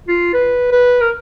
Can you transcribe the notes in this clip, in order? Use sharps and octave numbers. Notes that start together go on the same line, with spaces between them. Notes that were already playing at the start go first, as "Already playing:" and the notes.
F4
B4
B4
A#4